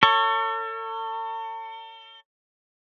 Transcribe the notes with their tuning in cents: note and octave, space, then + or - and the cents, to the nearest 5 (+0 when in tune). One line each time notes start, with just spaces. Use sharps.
A4 +40 C#5 +0